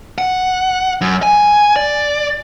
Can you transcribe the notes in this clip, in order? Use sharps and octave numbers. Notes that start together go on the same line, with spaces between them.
F#5
F#2
G#5
D5